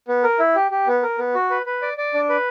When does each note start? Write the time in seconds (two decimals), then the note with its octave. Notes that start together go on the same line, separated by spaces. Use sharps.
0.08 B3
0.23 A#4
0.39 E4
0.56 G4
0.71 G4
0.87 B3
1.03 A#4
1.18 B3
1.35 F#4
1.50 B4
1.66 B4
1.82 D5
1.98 D5
2.14 D4
2.29 B4